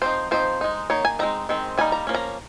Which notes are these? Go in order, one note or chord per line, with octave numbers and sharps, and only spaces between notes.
F3 C4 D#4 C5
F3 C4 D#4 C5
G#3 D#4
D#3 A#3 D#4 C#5
G#5
G#3 C4 D#4 A#5
D#3 G#3 C4
G3 A#3 D#4 G#5
A#5
F3 A#3 C#4
A#5